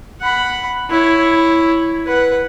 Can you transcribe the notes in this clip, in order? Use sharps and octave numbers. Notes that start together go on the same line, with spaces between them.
F#5 B5
E4 C#5
B4 F#5